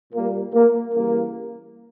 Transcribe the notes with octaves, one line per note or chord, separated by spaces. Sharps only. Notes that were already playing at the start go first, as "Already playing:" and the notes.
A#2 G3 A#3
A#3
C#3 E3 G3 A#3